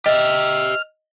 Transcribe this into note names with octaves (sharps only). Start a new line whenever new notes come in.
G4 D#5 E5 F6